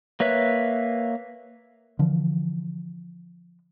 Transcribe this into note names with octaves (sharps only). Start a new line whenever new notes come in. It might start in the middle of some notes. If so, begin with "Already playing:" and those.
A#3 B4 C#5 E5 F#6
D3 E3 F3